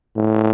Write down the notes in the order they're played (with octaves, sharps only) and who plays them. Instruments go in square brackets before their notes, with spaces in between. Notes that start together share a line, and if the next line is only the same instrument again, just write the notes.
[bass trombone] A2